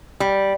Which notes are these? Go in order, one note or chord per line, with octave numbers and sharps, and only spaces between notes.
G3